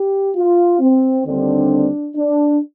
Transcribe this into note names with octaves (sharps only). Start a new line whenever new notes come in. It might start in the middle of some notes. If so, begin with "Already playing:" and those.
Already playing: G4
F4
C4
D#2 D3 G3 C4 D4
D4